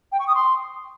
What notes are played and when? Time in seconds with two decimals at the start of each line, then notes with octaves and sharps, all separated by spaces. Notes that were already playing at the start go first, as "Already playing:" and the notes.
0.12 G5
0.20 C#6
0.27 D#6
0.35 C6